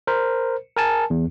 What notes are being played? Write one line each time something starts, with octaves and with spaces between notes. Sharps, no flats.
A#4 C5
A#4 G#5 A5
E2